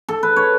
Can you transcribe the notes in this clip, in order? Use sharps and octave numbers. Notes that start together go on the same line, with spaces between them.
A4
B4
C#5